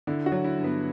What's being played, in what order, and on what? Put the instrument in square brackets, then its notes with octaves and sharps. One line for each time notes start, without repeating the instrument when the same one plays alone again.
[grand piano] D3 E4
F#4
F#3
E4
G2
B3